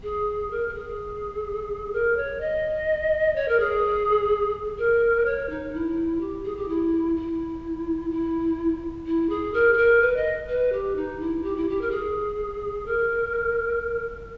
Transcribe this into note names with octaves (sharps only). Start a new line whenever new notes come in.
G#4
A#4
A#4
G#4
A#4
C#5
D#5
C#5
A#4
G#4
A#4
C#5
D#4
E4
G4
G#4
G4
E4
E4
E4
E4
G#4
A#4
G#4
A#4
B4
D#5
B4
G4
D#4
E4
G4
E4
G4
A#4
G#4
A#4